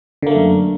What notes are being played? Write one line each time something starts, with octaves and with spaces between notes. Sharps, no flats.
F#2 D3 A3 A#3